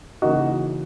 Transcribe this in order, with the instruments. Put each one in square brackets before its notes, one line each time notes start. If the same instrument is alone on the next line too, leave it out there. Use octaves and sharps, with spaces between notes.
[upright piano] C#3 E3 A#3 D#4 F#4